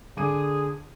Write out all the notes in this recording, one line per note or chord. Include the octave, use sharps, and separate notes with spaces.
D3 G#4 D6 D#7